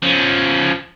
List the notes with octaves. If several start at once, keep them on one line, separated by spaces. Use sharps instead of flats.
F3 C#4